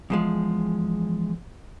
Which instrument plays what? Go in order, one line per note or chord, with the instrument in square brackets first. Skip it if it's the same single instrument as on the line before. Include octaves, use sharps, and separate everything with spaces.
[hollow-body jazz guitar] E2 F3 G#3